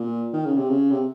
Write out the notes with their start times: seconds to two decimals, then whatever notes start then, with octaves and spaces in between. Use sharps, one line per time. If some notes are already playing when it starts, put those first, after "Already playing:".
Already playing: A#2
0.33 D#3
0.46 C#3
0.57 C3
0.69 C#3
0.91 C3